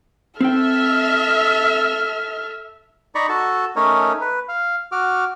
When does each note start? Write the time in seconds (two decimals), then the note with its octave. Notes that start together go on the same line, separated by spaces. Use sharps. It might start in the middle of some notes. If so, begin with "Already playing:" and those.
0.41 C4 A4 E5 G5 F6
3.15 D#4 D5 A#5 B5 C#6
3.29 F#4 A4 A5
3.76 A3 C#4 D#4 A#4 C#5
4.21 B4
4.49 F5
4.92 F#4 D6 F6